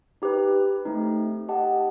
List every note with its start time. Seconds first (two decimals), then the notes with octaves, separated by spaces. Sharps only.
0.22 D#4 G4 B4
0.85 A3 C4 D#4
1.49 G4 D#5 F#5 A5